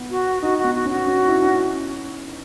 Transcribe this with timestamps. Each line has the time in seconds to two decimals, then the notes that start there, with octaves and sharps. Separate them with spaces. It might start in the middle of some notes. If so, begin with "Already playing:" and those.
Already playing: B3
0.10 F#4
0.42 D#4 F#4
0.58 F#4
0.64 B3
0.75 F#4
0.86 C#4 F#4
1.07 C#4
1.28 E4
1.42 C#4